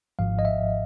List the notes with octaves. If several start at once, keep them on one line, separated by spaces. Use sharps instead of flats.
G#1 G#2 F3 F5
D#5
E5